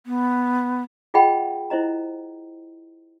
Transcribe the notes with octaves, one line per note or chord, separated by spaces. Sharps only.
B3
F4 G#4 D#5 F#5 G5 B5
E4 C5 D#5 A#5